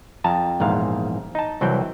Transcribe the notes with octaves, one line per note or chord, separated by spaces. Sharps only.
F2 A5 A#5
A#1 E2 G#2 F5
D#4 A5
C2 E3 F#3 C4 G5